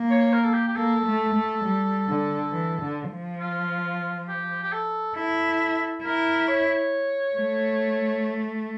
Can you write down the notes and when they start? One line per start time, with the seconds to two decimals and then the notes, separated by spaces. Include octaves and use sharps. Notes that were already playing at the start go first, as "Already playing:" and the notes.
Already playing: A#3
0.11 C#5
0.33 A#4
0.44 A4
0.54 G4
0.68 G4
0.76 A#3 A4
1.06 A3
1.34 A3
1.64 G3
2.08 D3
2.52 E3
2.82 D3
3.11 F3
3.40 F4
4.29 G4
4.63 G4
4.73 A4
5.16 E4 A4
6.04 E4 A#4
6.48 C#5
7.36 A3